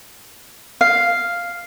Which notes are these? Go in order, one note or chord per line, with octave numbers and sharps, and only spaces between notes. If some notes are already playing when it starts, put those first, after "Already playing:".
F5